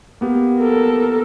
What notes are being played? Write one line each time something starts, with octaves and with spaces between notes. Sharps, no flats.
A#3 B3 G4
A4 A#4